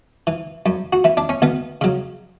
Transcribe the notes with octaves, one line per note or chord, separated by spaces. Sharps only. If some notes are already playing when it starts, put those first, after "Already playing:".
E3
F#2
F#4
E3 E4
D4
C#4
D2 B3
C#3 F#3